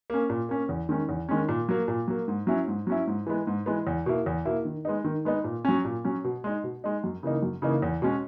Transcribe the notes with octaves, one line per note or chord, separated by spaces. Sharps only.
A#3 C#4
A#2
A#3 C#4
E2
D#3 G#3 C#4
E2
D#3 G#3 C#4
A#2
F#3 A#3
A#2
F#3 A#3
G#2
F#3 C#4 E4
G#2
F#3 C#4 E4
G#2
E3 G#3 B3
G#2
E3 G#3 B3
E2
B2 A#3 E4
E2
B2 A#3 E4
D#3
G#3 B3 D#4
D#3
G#3 B3 D#4
A#2
F#3 C#4
A#2
F#3 C#4
B2
G#3 D#4
B2
G#3 D#4
F#2
C#3 E3 A#3 D#4
F#2
C#3 E3 A#3 D#4
E2
B2 G#3 C#4